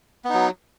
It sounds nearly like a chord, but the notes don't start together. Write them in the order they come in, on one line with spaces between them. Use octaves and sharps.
B3 D#4 F#3